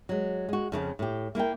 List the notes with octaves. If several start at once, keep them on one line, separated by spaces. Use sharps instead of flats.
F#3 G#3
G#3 F#4
F2 C#3 E3 F3
A2 G4
A#3 E4 A#4 G5